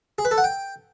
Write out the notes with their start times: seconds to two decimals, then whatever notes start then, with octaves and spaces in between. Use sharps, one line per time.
0.18 G#4
0.25 B4
0.31 A4
0.38 F#5
0.44 G5